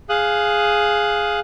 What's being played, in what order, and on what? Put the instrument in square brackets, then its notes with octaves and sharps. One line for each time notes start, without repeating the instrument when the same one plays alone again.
[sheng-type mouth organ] G#4 F5 D#6 F#6